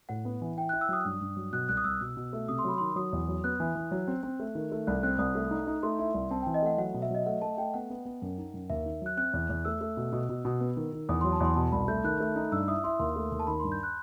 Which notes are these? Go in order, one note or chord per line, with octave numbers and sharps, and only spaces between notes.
A2 F#5
B3
E3
E4 G5
E4 F#6
E6
F#3 D#6
G2
G2
F#3
B2 F#6
C2 F#6
D#6
C2 E6
B2
B2
A3
C3 D#6
C6
F#3 B5
D#3 C6
F#3 D#6
E2
F#3
B3 F#6
E3
E3
F#3
C4
C4
A3
D#3
A3
C2 F#6
C4 F#6
C2 D#6
A3
D#4
D#4
A3 C6
E4
C2
C4 A5
E3 G5
D#5
A3 F#5
F#3 F#5
B2
E5
F#3 D#5
A3 F#5
A3 A5
A3 G5
B3 F#5
B3
B3
F#2
D#4
F#2
D#2 E5
D#3
F#3 F#6
C4 F#6
E2
E2
A3 E6
A3
B2
B2
B2
B2
B3
D#3
D#3
E2 D#6
F#3 C6
A5
E2 C6
B2 A5
C2 B5
A3 G6
D#3 F#6
A3
D#4
G2 E6
E4 D#6
E4 C6
D#2 C6
A3
D#2
A5
D#3 B5
G2 C6
G6
F#6